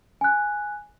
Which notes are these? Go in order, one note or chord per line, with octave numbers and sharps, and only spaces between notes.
G#5 F#6